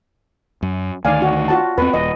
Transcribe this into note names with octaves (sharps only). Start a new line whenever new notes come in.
F#2
D2 D#3 D5 F5 G#5
F#4
F4 F#4 A5
E2 C4 B4
D#1 D#5